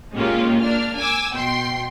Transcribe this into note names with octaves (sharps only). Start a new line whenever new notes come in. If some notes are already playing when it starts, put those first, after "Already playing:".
A#2 G#3 A#3 C#4 F4 G4
A#3 D4 F6
G#5 D6 E6
B2 G5 C6